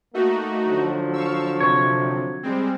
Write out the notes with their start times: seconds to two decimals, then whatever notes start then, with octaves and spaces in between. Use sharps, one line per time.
0.14 A3 A#3 D#4 F#4
0.67 D3 F3 F#3
1.13 F5 C#6 E6
1.60 C3 C#5
2.43 G3 G#3 C4